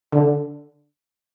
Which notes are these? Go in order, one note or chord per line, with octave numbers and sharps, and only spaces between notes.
D3